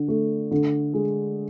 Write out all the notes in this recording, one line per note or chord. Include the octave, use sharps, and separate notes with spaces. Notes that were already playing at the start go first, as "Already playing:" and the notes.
Already playing: D3
A3
D3
G#3